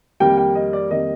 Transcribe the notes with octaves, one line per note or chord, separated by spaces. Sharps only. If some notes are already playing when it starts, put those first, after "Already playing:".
F2 D#3 G3 A#3 G5
G5
D#5
D5
F2 D#3 G3 A#3 D#5